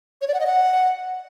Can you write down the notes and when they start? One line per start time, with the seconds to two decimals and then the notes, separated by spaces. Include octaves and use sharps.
0.21 C#5
0.28 D5
0.34 F#5
0.40 D#5
0.47 F#5